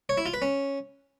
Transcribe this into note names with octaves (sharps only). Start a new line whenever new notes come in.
C#5
E4
F4
B4
C#4